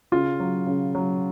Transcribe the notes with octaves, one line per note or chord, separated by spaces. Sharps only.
C#3 F4
F#3
C#3
F#3